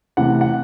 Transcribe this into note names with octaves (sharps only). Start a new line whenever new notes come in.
C3 E3 A3 F#5
F#5